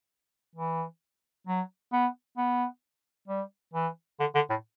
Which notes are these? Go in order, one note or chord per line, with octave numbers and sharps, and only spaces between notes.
E3
F#3
B3
B3
G3
E3
D3
D3
A2